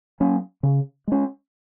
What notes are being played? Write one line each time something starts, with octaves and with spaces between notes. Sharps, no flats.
F#3 A#3 C#4
C#3
G#3 C#4